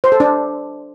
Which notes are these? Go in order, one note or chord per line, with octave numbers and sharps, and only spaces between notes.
C5
A4
D4